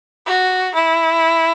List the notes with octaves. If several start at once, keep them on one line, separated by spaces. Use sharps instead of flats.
F#4
E4